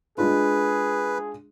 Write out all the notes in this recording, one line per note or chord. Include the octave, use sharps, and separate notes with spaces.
G#3 D4 F4 G#4 B4